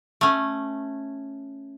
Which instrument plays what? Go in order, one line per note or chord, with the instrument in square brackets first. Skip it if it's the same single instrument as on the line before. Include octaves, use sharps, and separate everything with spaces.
[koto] A3 C#4